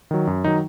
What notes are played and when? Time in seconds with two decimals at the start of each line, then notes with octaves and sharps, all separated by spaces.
0.11 D#3 F#3
0.27 F#2
0.44 D#3 F#3 D#4